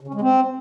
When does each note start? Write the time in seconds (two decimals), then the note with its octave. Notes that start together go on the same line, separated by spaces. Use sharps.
0.01 C#3
0.08 C#4
0.14 G#3
0.21 C4